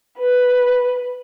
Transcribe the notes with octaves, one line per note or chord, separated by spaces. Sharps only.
B4